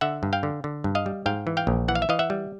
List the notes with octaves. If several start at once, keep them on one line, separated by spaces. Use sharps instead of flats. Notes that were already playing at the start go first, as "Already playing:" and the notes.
D3 E5 F#5
G2
F5 G5
D3
D3
G2
D#5 F5
G3
G#2 F5 G5
E3
F5 G5
A#1
E3 F#5
F5
E5
E3 D#5 F5
E5 F#5
G3